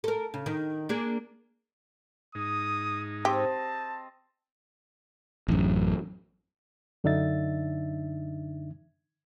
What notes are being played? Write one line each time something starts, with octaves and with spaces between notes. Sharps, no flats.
A4 A#4
C#3
D#3
A#3 D4 G#4
G#2 D#4 D#6
C4 G4 D#5 A5
A1 F#2
F#2 D3 D4 D#4 E5 A6